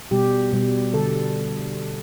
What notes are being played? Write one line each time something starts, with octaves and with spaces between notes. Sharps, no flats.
B2 G3 G4
B2 G3
D3 G3 A4